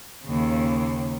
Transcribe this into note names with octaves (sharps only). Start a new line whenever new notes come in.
D#2 C#3